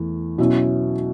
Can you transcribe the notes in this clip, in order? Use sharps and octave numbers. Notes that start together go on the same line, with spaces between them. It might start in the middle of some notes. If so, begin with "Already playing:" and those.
Already playing: E2 A3
B2 F#3 C#4 E4